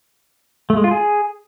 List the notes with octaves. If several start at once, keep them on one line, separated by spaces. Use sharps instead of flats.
A3
G#3
F4
G#4